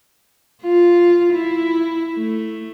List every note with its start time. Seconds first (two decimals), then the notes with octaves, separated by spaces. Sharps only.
0.62 F4
1.33 E4
2.15 A3